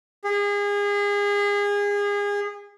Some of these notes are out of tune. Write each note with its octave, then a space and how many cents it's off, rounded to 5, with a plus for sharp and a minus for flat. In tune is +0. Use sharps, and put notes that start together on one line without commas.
G#4 -30